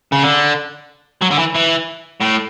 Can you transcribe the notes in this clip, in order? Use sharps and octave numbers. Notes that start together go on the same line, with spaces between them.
C#3
D3
F#3
D3
E3
E3
A2